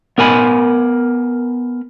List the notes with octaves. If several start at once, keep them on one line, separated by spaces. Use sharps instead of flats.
B3 A#4 G#5 B5